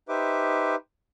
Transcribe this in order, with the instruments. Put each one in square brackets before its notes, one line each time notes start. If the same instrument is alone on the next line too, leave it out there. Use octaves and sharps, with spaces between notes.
[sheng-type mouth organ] D#4 G4 B4 C5 E5 D6